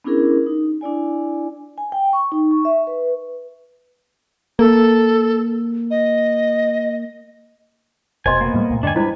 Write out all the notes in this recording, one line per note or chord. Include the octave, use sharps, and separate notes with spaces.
B3 C#4 D4 E4 G#4 A#4
D#4
D4 E4 D5 G#5
G#5
G5
C#6
D#4
C#6
E5
B4
A#3 A4
D#5
F1 B2 C5 D#5 G#5 C6
A#3 B3
A2 G3 G#3
C2 A#2 A3
E2 G2 D3 D4 D#5 G5 G#5
G3 G#3 D4 E4 B4 C5